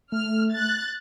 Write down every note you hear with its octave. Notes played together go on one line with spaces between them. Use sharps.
A3 F6
F#6 A6